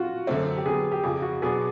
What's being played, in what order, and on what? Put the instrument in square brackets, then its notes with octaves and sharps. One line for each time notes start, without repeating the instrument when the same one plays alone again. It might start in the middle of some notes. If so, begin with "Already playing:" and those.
Already playing: [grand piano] F4 F#4
[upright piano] F#2 D3 F#3 A3 C4
[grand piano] G4
[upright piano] D3 F#3 B3 [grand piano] G#4
[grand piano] G4
[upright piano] F2 C#3 F3 [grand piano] G#4
[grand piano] F#4
[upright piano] B2 F#3 B3 D4 [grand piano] G#4